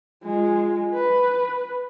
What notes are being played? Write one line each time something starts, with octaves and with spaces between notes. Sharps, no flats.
G#3 F4
B4